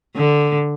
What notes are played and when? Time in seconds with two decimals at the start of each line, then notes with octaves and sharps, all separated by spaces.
0.17 D3